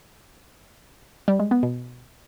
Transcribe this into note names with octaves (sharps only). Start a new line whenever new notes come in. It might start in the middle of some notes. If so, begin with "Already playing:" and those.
G3
G#3
B3
B2